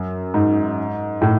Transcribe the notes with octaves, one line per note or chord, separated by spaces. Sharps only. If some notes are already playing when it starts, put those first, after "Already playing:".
Already playing: F#2
G#2
A2